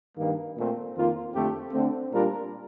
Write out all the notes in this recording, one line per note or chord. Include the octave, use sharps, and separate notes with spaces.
G2 D#3 A#3
A#2 A3 C4
F2 D#3 A#3 F4
F2 D3 A3 C4 G4
D3 A3 C4
A#2 G3 D4 F4 A#4